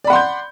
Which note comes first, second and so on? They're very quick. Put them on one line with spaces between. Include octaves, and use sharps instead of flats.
D5 B5 F#5 C6 G6